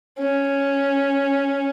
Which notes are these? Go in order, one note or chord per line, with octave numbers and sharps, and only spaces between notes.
C#4